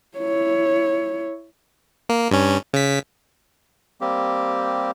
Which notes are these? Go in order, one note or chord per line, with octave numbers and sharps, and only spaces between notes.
E4 C#5
A#3
G2 C#4
C#3 B6
G3 A#3 C4 G4